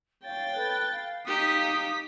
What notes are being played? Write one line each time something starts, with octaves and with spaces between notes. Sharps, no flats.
C#5 F5 G5 A6
A4 B4 F#6
F5
D#4 G4 D#6 B6